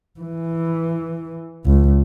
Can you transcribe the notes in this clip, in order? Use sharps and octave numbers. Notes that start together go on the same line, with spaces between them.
E3
C#2